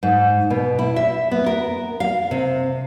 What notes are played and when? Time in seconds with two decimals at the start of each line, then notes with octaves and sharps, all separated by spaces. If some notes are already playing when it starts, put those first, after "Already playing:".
0.03 G#2
0.50 B2
0.79 E4
0.96 E5
1.31 B3
1.46 A#4
2.00 F5
2.31 C3